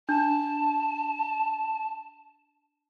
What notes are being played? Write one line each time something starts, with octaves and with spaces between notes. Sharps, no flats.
D4 A5